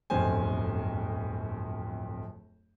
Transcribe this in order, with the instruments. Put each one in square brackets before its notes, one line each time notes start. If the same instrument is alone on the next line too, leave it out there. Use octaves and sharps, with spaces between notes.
[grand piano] D1 G1 F2 C5 G#5